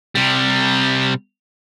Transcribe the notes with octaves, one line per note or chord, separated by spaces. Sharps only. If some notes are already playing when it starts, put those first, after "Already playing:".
C3 G3